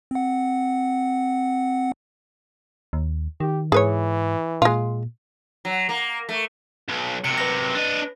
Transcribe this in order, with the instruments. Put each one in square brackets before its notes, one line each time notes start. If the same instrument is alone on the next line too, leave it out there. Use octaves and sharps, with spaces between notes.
[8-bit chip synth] C4 F#5
[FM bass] D#2
[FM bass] D#3 [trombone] G4
[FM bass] G#2 [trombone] E3 [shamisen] G#4 B4 C#5
[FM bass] A#2 [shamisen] G#3 F4
[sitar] F#3
A#3
A3
[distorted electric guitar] B1
[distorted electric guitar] F#2 C3 [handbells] C#7
[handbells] B4 A#6
[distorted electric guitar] D4 D#5